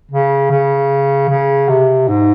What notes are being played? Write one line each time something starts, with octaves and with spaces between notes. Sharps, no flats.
C#3
C#3
C#3
C3
G#2